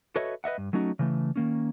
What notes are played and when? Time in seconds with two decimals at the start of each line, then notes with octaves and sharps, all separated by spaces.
0.16 F#4 A4 B4 C#5 D#5 E5
0.44 B4 D#5 E5 F#5
0.58 G2
0.73 F#3 A3 C#4 D#4 F#4
0.99 C#3 E3 A3
1.36 D#3 A#3 C#4